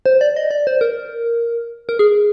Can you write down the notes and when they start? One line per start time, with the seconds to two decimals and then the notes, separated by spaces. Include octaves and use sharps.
0.06 C5
0.21 D5
0.36 D#5
0.51 D5
0.67 C5
0.81 A#4
1.89 A#4
1.99 G#4